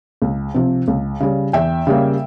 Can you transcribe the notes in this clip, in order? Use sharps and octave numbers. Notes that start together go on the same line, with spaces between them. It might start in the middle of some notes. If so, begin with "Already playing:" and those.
C#2
C3 F3 C4
C#2
C#3 G3
E2 E5 G5
C#3 G3 A#3